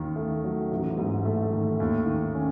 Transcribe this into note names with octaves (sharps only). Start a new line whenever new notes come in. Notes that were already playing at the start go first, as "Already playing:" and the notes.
Already playing: D#2 D#3
A3
F#3
A1
G#2
A3
D#3
D#2
D#3
C#4